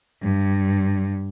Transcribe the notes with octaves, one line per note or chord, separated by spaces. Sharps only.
G2